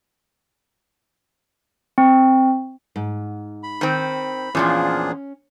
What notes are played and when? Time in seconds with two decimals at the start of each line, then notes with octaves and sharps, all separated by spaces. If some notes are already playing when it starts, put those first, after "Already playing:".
1.98 C4
2.96 G#2
3.63 B5
3.81 D#3 C4
4.55 E2 A#2 F3 C#4 D4 F4 G#4